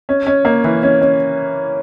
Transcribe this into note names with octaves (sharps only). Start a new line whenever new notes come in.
C#4
C#4
A#3
E3
C#4
C#4